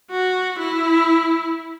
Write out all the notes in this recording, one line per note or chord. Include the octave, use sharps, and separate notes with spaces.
F#4
E4